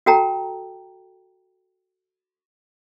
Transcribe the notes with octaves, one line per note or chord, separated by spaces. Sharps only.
F#4 A4 G5 A5 A#5